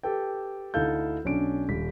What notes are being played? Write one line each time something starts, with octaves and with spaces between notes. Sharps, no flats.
G4 A4 B4 G5
D2 D#4 E4 A4 F5 G6
B1 C#4 D4 D7
D#1 B6